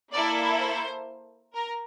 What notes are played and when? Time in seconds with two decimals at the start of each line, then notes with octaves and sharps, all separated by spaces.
0.13 A#3 E4 A4 D5
0.60 C5
1.54 A#4